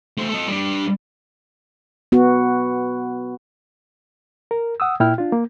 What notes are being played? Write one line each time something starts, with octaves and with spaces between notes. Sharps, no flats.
A3 C5
A4 D#5
G3 D4
B3 F#4
A#4
F#5 D#6 E6
A#2 E4 G5 F6
D4 F4
A#3